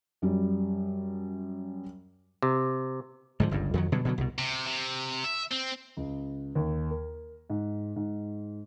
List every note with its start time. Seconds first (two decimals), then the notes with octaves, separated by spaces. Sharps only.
0.22 F#2 G3
2.42 C3
3.40 G#2 D3 F3
3.51 G1 C#2 G2
3.74 F2 D#3 F#3
3.92 B2 D3 F#3 G3
4.05 B2 D3 F#3
4.18 C2 B2
4.38 C3
4.67 C3
5.25 E5
5.52 C4
5.97 C#2
6.55 D#2
6.91 A#4
7.50 G#2
7.96 G#2